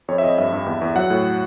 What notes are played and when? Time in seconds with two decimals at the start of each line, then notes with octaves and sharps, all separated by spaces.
0.08 F2 C#5
0.18 E5
0.23 F2 D#5
0.38 G2 E5
0.52 G2
0.66 E2
0.82 E2
0.95 F#3 F#5
1.10 A2